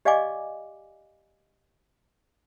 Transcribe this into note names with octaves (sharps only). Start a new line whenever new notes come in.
G4 D5 D#5 F5 G#5 D6